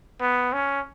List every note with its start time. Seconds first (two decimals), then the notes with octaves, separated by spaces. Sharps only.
0.21 B3
0.53 C#4